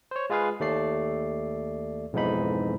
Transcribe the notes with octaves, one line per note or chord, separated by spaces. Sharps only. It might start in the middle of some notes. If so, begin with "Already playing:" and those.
C5 C#5
G#3 F4 G#4 B4 F5
D#2 A3 D5 C7
B1 F2 G#2 E3 D#4 B5